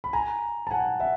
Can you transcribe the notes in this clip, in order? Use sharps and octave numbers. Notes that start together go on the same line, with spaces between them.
B5
G#5 A#5
A5
F#5 G#5
E5 F#5